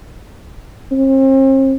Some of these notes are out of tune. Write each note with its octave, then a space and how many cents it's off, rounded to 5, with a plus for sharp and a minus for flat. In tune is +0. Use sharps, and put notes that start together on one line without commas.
C4 +40